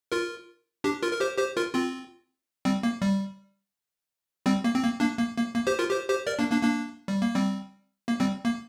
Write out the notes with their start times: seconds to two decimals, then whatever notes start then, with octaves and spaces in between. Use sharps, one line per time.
0.12 F4 A#4
0.84 D4 G4
1.03 F4 A#4
1.13 A#4
1.20 G4 C5
1.38 G4 C5
1.57 F4 A#4
1.75 C4 F4
2.65 G3 C4
2.83 A#3
3.02 G3
4.46 G3 C4
4.64 A#3
4.75 C4
4.83 A#3
5.00 A#3 D4
5.19 A#3
5.37 A#3
5.55 A#3
5.67 G4 C5
5.79 F4 A#4
5.91 G4 C5
6.09 G4 C5
6.27 A#4 D5
6.39 A#3 D4
6.51 A#3 D4
6.63 A#3 D4
7.08 G3
7.22 A#3
7.35 G3 C4
8.08 A#3
8.20 G3 C4
8.45 A#3